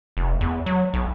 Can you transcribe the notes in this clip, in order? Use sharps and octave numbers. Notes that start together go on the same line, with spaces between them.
F1
E2
F#3
B1